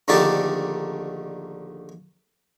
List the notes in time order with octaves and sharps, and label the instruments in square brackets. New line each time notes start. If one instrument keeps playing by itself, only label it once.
[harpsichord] A#1 D3 D#3 A3 G4 A5